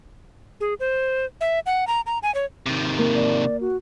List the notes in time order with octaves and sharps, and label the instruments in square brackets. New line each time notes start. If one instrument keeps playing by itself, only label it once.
[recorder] G#4
C5
E5
F#5
A#5
A#5
G#5
C#5
[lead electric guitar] C3 D#3
[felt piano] A#3
[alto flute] D5
F#4